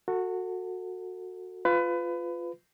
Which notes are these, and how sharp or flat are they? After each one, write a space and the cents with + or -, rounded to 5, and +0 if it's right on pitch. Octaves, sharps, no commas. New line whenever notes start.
F#4 -10 A4 +30
F4 +0 B4 +25